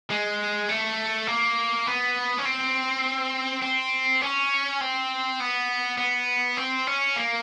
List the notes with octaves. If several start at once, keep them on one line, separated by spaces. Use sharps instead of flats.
G#3
A3
A#3
B3
C#4
C4
C4
C#4
C4
B3
B3
C4
C#4
A#3